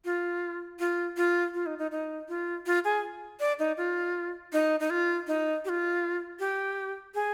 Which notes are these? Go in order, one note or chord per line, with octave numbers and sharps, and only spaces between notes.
F4
F4
F4
F4
D#4
D#4
D#4
F4
F4
G#4
D5
D#4
F4
D#4
D#4
F4
D#4
G4
F4
G4
G#4